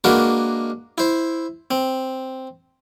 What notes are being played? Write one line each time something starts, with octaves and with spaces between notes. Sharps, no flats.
G#3 A#3 D4 F#4 A#4 B4
E4 C5
C4